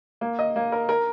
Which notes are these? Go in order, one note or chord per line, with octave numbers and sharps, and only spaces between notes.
A#3
D#5
A#3
A#4
A#4